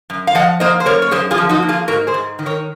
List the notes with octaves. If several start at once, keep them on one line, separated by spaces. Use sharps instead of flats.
F#2
F5
F3 D#5 F#5
A#3 C5 D#5
C5
F#2 A#4 C#5
C#5
F#2 G#4 C5
F4 G#4
F3
D#4 F#4
A#3
F4 G#4
G#2 F#4 A#4
G#4 C5
G#2
D#3
A#4 C#5